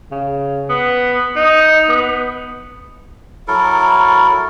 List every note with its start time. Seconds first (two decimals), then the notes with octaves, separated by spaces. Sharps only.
0.11 C#3
0.69 B3
1.36 D#4
1.89 B3
3.48 F#3 E4 A4 A#4